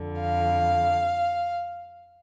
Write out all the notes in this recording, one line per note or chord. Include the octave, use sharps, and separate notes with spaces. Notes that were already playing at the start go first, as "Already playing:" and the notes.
Already playing: F2 D3
F5